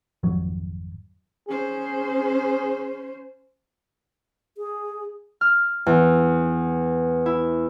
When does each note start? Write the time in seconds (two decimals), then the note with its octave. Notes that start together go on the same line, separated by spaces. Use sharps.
0.23 G#1 F2 F#3
1.48 C#4 G#4 C5
4.57 G#4
5.41 F6
5.86 E2
7.26 E4